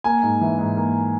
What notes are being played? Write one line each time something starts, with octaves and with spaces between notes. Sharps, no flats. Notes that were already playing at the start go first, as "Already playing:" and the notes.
A#3 G#5
G#2
E3
G#2
A#3